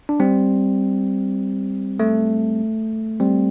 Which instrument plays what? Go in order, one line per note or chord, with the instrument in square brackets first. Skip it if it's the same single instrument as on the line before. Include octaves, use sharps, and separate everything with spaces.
[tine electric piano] D4
G3 C4
A3
G3 C4